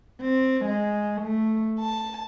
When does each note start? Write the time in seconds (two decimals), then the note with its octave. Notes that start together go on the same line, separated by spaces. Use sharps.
0.21 C4
0.66 G#3
1.21 A3
1.80 A5